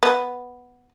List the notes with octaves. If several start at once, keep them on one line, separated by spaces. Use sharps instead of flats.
B3